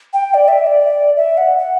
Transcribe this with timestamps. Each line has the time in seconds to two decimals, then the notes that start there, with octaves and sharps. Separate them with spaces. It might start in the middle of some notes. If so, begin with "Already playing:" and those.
0.13 G5
0.34 D5
0.48 E5
0.62 E5
0.67 D5
1.17 E5
1.38 F#5
1.58 F#5